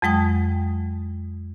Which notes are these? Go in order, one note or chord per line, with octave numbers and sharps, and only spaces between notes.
F2 F#3 G#3 G5 D#6